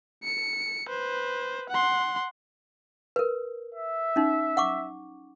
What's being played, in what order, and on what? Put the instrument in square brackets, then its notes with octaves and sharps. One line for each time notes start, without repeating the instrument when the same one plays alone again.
[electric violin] C#7
B4 C5
F#5 C6
[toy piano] A#4 B4
[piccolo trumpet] E5
[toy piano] C#4 D#4
F#5 C#6 D6